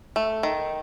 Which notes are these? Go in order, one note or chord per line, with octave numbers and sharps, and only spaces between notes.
A3
D#3